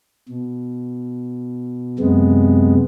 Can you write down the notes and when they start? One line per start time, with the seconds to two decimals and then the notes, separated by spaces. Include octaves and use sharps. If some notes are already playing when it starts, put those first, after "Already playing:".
0.29 B2
1.99 F#2 C3 G#3 B3